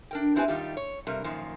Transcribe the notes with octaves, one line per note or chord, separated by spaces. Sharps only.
D4 A#4 G5
B3 C4 E4 G4 B4 G#5
D#3 G3 D#4 F4 G4
C#5
G2 C3 G3 A#4
F#2 A#2 D#3 F3